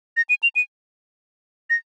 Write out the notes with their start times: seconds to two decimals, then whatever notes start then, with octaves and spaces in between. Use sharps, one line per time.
0.17 A#6
0.29 D#7
0.43 F7
0.56 D#7
1.70 A#6